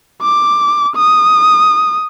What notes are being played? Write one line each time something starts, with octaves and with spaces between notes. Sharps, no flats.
D6
D#6